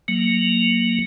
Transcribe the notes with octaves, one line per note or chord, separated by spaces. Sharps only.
F#3 A#3